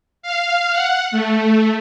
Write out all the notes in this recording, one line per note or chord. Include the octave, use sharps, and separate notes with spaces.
F5
F#5
A3